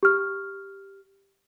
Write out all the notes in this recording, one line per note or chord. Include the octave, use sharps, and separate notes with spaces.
G4 F6